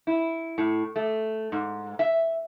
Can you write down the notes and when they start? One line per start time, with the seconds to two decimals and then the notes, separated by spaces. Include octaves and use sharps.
0.07 E4
0.58 A2
0.96 A3
1.52 G#2
1.99 E5